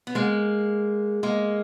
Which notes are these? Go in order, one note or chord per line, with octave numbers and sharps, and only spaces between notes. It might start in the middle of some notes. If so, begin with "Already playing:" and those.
B3
G#3 A#3
G#3 A#3